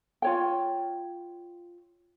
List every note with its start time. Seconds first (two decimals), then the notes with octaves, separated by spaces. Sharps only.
0.22 F4 C#5 G5